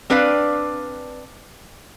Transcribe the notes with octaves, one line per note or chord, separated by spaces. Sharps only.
C4 D4 B4 D5 F5